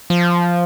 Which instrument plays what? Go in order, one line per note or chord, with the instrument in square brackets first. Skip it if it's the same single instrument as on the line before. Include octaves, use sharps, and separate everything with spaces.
[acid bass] F3